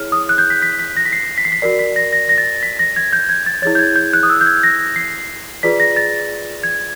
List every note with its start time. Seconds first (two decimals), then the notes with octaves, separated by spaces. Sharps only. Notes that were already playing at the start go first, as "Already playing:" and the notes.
Already playing: E4 G#4 C#5 F6
0.12 D#6
0.29 F#6
0.38 G6
0.50 B6
0.62 B6
0.79 B6
0.97 A#6
1.06 B6
1.13 C7
1.38 B6
1.45 C7
1.52 B6
1.62 F#4 A#4 D5 C7
1.79 B6
1.96 A#6
2.13 A#6
2.29 A#6
2.38 A6
2.63 B6
2.79 A#6
2.96 G#6
3.13 G6
3.29 G#6
3.46 A6
3.62 E4 G#4 C#5 A6
3.75 G6
3.79 G#6
3.96 G6
4.13 F#6
4.23 D#6
4.30 E6
4.41 G6
4.46 G#6
4.63 A#6
4.96 C7
5.63 F4 G#4 B4 D5 B6
5.80 A#6
5.97 A6
6.63 G#6